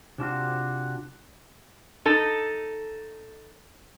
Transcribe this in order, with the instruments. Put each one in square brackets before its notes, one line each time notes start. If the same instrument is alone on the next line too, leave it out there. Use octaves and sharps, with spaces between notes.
[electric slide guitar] C3 D4 F4 F#4
[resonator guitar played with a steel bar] D#4 A4